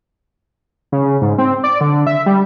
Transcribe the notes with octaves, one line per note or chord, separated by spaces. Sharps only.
C#3
G#2
C4
D5
D3
E5
G3